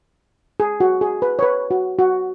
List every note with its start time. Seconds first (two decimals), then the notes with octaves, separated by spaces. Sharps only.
0.60 G#4
0.80 F#4
1.01 G#4
1.22 B4
1.39 C#5
1.43 B4
1.71 F#4
1.99 F#4